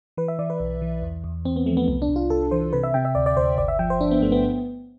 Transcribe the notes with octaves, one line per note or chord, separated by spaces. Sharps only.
E3 B4
E5
E3 D5
B4
B1
E3
E2
E2
E2 C4
B3
F3 A3
B3
C2 B3
D4
C2
F4
C2 A4
E3 C5
C3 B4
E5
C3 G5
E5
D2 D5
D5
D2 C5
G1 D5
E5
F3 G5
C5
G1 D4
B3
G2 A3
B3